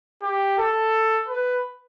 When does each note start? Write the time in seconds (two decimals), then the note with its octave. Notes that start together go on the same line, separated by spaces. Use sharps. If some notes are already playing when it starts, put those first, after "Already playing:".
0.22 G4
0.58 A4
1.28 B4